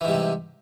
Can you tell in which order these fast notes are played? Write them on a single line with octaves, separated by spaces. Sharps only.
E3 G#2 G3 C3